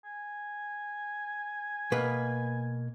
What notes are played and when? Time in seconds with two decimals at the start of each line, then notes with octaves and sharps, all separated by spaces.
0.05 G#5
1.92 B2 A#3 B4